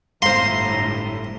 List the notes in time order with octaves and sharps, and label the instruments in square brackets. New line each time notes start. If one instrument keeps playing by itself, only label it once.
[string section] G1 A2 [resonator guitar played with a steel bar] C5 F5 [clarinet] A#5 [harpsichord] C6